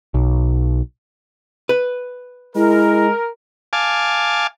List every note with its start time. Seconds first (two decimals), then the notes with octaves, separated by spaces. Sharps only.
0.14 B1
1.69 B4
2.56 G#3 E4 A#4
3.73 F5 G#5 A5 D6